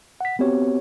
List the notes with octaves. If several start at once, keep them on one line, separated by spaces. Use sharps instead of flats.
F#5 B6
B3 C4 F#4 G4 C#5